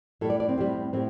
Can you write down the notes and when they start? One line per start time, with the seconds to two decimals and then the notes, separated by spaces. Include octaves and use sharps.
0.21 A2 G3 A4
0.30 D5
0.40 D5
0.49 C4
0.58 A2 G3
0.93 A2 C4